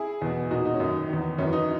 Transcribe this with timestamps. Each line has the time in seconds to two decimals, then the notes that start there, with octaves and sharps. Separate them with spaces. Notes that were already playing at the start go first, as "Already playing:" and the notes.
Already playing: E4 G#4
0.22 E2 B2
0.51 A#2 D#4 F#4
0.65 D#4
0.74 C#4
0.80 F#2 D#3 D#4
1.09 E2 D#3
1.38 F#2 E3 C#4
1.53 D#4